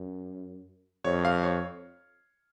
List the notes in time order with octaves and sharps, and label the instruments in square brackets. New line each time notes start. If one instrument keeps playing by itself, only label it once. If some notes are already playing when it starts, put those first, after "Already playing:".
Already playing: [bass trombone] F#2
[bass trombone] F2 [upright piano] C#5
[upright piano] F5
C#5